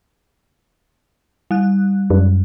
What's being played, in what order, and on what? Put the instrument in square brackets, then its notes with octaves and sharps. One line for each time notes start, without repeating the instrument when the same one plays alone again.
[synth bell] G3 F#6
[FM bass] F#2